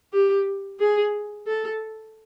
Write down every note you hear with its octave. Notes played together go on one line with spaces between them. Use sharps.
G4
G#4
A4